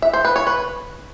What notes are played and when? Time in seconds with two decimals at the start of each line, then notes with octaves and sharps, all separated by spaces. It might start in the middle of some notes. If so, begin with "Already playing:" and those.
0.02 E5
0.13 C5
0.25 B4
0.36 C#5
0.47 B4